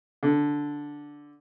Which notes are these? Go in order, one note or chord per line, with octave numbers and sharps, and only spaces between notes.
D3